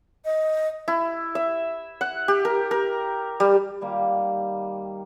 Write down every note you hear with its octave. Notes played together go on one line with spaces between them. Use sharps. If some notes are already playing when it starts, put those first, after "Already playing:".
D#5
E4
E5
F#5
G4
A#4
A#4
G3
D#3 G3 A#3